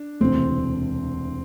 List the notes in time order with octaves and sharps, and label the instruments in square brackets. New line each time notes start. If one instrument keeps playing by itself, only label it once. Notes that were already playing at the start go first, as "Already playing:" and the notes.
Already playing: [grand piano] D4
[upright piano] E1 D2 C3 E3 [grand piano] C4